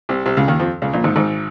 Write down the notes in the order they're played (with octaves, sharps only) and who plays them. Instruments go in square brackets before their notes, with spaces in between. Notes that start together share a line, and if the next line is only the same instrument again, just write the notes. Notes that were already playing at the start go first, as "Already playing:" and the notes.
[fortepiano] C2 C3
C2 C3
C#2 C#3
D#2 D#3
F2 F3
C#2 C#3
A#1 A#2
G#1 G#2
G#1 G#2